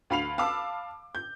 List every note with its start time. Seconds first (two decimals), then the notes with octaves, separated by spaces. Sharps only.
0.10 D2 F5 B5 C7 F7
0.38 F5 A5 B5 D6 E6
1.15 G6